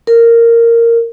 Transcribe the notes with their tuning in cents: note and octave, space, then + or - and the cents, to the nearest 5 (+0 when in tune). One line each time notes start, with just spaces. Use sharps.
A#4 -10